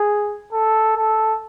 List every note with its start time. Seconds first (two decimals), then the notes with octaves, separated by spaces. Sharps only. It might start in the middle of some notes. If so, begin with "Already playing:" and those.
Already playing: G#4
0.53 A4
0.96 A4